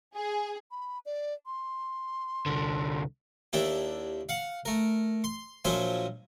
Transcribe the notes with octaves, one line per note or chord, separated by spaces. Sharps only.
G#4
B5
D5
C6
C2 D3
D#2 D4 E4 G4
F5 F#5
A3 A#4
C6
A#1 F3 F#3 C5 E5 G#5